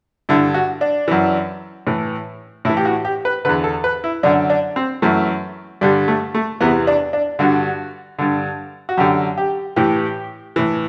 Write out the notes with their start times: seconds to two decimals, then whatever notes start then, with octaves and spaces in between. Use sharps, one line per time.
0.29 G2 D3 E4
0.54 F#4
0.81 D4
1.08 F#2 E3
1.87 A2 E3
2.65 A2 E4
2.69 E3
2.77 G4
2.85 F#4
3.05 G4
3.25 B4
3.45 D3 B4
3.49 E2
3.64 A4
3.84 B4
4.04 E4
4.23 F#2 D3 D4
4.50 D4
4.76 C4
5.02 F#2 E3 A3
5.81 G2 D3 G3
6.08 A3
6.35 A3
6.61 E2 C3 E3 B3
6.87 D4
7.13 D4
7.39 G2 D3 F#4
8.19 G2 D3
8.89 F#4
8.97 F#2 D3 G4
9.38 G4
9.76 A2 E3 G4
10.56 A2 E3